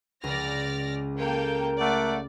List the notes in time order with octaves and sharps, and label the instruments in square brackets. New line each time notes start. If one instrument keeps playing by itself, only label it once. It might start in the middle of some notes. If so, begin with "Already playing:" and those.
[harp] C#2 [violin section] D5 F6 A#6
[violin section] A#3 A4 G5 [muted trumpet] A#4
[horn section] A3 F#5 [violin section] D5